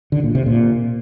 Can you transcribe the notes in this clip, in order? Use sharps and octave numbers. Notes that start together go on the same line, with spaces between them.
D3
A#2
C3
A#2